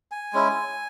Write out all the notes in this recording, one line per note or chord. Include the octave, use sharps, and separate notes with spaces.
G#5
G#3 C#4 E4